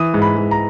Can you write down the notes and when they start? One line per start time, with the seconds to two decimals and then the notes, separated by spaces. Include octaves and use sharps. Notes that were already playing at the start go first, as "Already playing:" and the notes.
Already playing: E3 D#6
0.14 G#2
0.22 B5
0.37 G#2
0.51 A#5